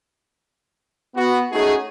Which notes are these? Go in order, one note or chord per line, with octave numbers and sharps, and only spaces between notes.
B3 F#4
A3 C#4 D#4 F#4 G#4